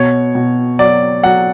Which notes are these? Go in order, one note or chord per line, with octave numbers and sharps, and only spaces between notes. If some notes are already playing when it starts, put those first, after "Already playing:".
Already playing: B2 C#5
B2
F#3 D5
F#3 F#5